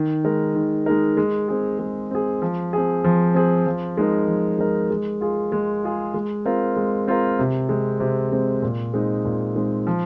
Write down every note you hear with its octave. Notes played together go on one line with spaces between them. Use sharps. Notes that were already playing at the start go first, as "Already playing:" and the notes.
Already playing: D#3
G#3 D#4 A#4
D#3
G#3 D#4 A#4
G#3
C4 G#4
G#3
C4 G#4
F3
C4 G#4
F3
C4 G#4
F3
G#3 D#4 A#4
F3
G#3 D#4 A#4
G#3
F4 G#4
G#3
F4 G#4
G#3
C4 F4 A#4
G#3
C4 F4 A#4
C3
G#3 C4
C3
G#3 C4
A#2
G#3 C4 D#4
A#2
G#3 C4 D#4
F3